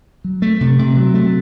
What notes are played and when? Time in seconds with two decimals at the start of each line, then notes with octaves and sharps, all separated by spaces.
0.24 F#3
0.42 A3
0.61 C3
0.79 C3
0.97 F#3
1.14 A3